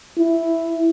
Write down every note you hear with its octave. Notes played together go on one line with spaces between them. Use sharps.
E4